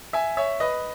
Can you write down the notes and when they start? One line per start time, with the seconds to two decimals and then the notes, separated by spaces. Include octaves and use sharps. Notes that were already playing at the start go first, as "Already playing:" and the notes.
0.13 E5 G#5
0.37 C#5 E5
0.60 B4 D#5